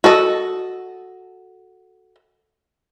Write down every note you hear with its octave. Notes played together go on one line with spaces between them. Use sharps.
F#4 A4 D#5